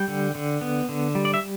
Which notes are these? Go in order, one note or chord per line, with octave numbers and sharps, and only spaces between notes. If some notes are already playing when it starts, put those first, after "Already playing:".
Already playing: G3 G5
D3
D3
B3
D3
G3
D5
E5